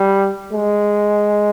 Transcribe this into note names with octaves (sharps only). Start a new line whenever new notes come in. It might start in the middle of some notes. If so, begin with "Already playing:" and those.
Already playing: G3
G#3